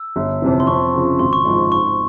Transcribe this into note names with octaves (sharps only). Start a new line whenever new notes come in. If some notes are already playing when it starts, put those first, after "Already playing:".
Already playing: E6
G1
F2 C3 E3
C6
F2 C#6
C#3 F3
G#1 C6
C#6
G#2 F3 G#3 C6
G#2 C#6